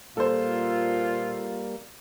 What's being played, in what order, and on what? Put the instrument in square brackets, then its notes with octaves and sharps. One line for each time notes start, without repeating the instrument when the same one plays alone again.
[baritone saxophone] A#2 [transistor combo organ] G3 A#3 [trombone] F4 [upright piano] A4 C5